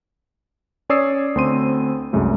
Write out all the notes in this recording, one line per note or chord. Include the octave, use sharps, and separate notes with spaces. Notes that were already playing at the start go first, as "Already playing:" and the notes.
C#4 C#5 D5 D#6 E6 C7
D2 C4 C6 D#7
C2 F#2 G#3 A3